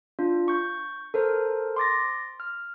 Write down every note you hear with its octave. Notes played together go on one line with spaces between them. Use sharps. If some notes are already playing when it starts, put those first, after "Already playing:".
D4 F4
C#6 G6
A4 A#4 C5
C6 D6 A6 A#6
F6